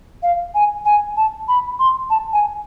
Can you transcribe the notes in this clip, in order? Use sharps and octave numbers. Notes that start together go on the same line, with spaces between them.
F5
G#5
G#5
A5
B5
C6
A5
G#5